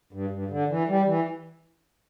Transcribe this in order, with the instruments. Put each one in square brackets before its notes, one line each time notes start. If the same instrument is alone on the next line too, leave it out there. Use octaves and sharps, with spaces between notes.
[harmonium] G2
G2
D3
E3
G3
E3